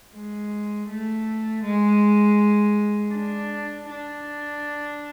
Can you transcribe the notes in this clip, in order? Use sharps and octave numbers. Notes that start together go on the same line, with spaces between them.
G#3
A3
G#3
D4
D4